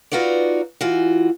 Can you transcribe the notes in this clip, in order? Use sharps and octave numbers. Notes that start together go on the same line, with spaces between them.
D#4 F4 F#4 B4 D5
E3 F4 F#4